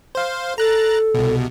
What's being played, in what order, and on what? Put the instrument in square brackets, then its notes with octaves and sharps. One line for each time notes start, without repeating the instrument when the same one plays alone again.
[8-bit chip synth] C5 F5
[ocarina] A4 [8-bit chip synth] A#5 F#6 A6
[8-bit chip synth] C2 B2